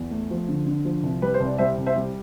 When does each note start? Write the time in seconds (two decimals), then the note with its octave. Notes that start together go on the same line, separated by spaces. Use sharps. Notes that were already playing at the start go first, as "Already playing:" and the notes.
Already playing: E2
0.11 A3
0.30 F3
0.48 D3
0.66 D3
0.85 F3
1.03 C2
1.22 G3 B4
1.34 C5
1.40 C2
1.46 D5
1.58 G3 C5 E5
1.78 C2
1.86 C5 E5
1.96 G3